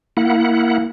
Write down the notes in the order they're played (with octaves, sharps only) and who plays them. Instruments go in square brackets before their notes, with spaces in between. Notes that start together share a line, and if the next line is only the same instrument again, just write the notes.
[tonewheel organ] A#3 E4 F#5